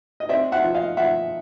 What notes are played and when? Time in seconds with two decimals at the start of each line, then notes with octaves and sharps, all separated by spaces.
0.20 D#5
0.29 C4 D5 E5
0.52 E5 F#5
0.63 F3
0.74 D#5 F5
0.97 F3 E5 F#5